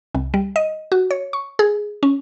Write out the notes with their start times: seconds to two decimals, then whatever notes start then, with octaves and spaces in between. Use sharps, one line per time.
0.15 C2
0.34 G3
0.56 D#5
0.92 F#4
1.11 C#5
1.33 C#6
1.59 G#4
2.03 C#4